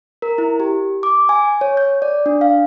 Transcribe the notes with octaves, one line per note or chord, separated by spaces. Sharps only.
A#4
E4
G4
D6
G#5
C#5
G6
D5
D4
F5